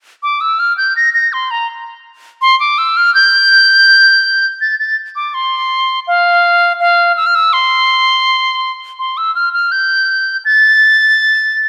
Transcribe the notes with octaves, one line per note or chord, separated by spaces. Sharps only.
D6
E6
F6
G6
A#6
A#6
C6
A#5
C6
D6
E6
F6
G6
A6
A6
D6
C6
F5
F5
E6
F6
E6
C6
C6
E6
F6
F6
G6
A6